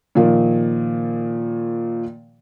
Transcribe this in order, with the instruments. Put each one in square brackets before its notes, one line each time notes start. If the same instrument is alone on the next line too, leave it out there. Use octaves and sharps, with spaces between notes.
[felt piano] A#2 D#3 F3